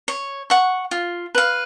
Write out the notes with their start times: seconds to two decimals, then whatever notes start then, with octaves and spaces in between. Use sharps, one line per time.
0.08 C#5
0.50 F#5 C#6
0.91 F4
1.35 B4 F5